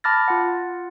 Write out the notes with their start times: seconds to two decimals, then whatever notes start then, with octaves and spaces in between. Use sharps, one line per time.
0.04 A5 B5 D6 F6 A6 A#6
0.28 F4 F#5